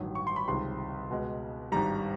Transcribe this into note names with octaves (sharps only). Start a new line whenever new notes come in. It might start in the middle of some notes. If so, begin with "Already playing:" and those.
Already playing: A1 G2 D#3 F#3
C#6
C6
B5
C#2 C3 D#3 G3 C6
C#2 B2 G#3
G#1 G2 D#3 G3 A#5